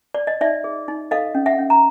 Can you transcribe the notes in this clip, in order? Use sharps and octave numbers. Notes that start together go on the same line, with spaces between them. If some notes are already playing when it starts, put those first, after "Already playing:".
D5
D#5
D#4 D5 E5
G#4
D#4
A4 D#5 F5
C#4
E5 F#5
C#4
A#5